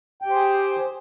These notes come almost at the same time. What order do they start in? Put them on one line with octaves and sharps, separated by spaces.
G5 G4 C5 G#4